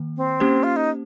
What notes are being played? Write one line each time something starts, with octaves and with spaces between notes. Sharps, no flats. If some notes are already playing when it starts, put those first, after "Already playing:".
Already playing: D#3 A#3
C4
A#3 C#4 G4 C5
F4
D#4